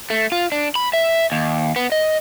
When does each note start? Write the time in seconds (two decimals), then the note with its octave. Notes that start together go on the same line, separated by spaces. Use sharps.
0.10 A3
0.32 F4
0.52 D4
0.75 B5
0.93 E5
1.32 D#2
1.76 B3
1.92 D#5